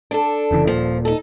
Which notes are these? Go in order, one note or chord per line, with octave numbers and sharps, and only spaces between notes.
D4 A4
F1 C#3 E3
D#1 G#1 A#2 F3
D#4 A4